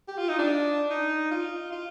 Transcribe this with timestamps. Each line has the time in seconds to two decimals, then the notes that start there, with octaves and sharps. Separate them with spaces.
0.08 G4
0.18 F4
0.29 D#4
0.39 D4
0.91 D#4
1.31 F4
1.72 F4